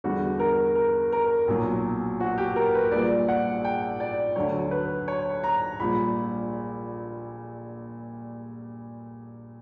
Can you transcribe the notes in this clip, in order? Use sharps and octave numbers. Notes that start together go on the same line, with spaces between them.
E2 D3 G3 F#4
A#4
A#4
A#4
B1 A#2 F#3
F#4
G4
A#4
B4
A#1 A#2 G3 D5
F#5
G5
D5
D2 D3 F#3 C#5
B4
C#5
A#5
A#1 A#2 G3 B5